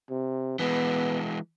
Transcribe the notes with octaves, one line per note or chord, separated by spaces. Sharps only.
C3
E3 G#3 B3